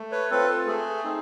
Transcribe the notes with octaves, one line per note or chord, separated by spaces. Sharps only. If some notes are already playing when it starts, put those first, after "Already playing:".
Already playing: A3
B4 C#5
C4 F4 A4 B4
A4
A3 G#4
C4 D#4